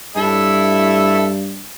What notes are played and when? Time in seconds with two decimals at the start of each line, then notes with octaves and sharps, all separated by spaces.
0.16 G2 E4 A4 E5